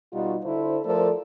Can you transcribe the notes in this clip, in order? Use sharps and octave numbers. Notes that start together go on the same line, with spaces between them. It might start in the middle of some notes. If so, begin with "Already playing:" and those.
B2 G3 D#4 F4 F#4
D3 E4 A4 C5
F3 A3 A4 A#4 C5 D5